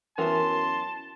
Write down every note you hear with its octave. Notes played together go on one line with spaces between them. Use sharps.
F#2 E3 B3 A#4 A5 C6